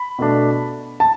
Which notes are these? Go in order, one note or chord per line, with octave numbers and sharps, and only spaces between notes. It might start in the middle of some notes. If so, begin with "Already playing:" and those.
Already playing: B5
B2 A3 D4
A5